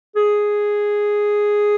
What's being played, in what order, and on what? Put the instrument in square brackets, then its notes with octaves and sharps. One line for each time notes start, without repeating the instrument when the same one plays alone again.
[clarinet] G#4